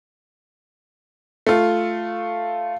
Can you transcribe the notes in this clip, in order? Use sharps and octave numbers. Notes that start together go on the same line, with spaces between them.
A3 F4